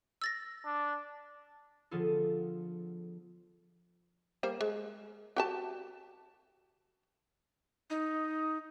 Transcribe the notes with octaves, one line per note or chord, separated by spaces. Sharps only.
E6 A6 A#6
D4
D3 F3 B3 F4 G#4 A4
G3 A#3 C5
G#3
F#4 G4 A5
D#4